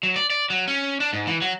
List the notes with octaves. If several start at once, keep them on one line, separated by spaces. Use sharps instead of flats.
F#3
D5
D5
F#3
C#4
D4
G#2
E3
F#3